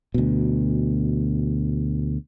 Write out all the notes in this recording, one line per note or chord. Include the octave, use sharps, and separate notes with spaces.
D2 B2